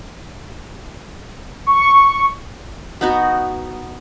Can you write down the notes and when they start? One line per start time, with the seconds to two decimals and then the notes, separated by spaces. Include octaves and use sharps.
1.67 C#6
3.01 B3 D#4 F#4